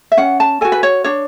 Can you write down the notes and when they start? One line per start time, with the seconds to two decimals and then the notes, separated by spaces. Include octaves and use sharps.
0.12 E5
0.17 C#4 F#5
0.40 A5
0.61 F#4 A4 G#5
0.72 B4
0.83 C#5
1.04 D4 C#5